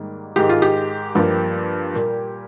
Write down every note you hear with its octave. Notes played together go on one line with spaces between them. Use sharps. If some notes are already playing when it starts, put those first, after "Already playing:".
Already playing: G#2 D#3 G3 A#3
G#2 D#3 G#3 G4
F4
G4
G2 F3 A#3
A#2 G3 A#3